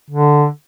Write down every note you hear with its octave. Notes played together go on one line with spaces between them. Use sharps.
D3